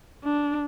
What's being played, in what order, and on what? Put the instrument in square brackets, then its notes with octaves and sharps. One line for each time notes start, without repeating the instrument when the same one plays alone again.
[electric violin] D4